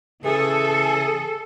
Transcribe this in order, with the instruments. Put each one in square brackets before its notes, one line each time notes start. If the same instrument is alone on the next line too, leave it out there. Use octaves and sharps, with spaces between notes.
[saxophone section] C#3 E3 G#4 [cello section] A4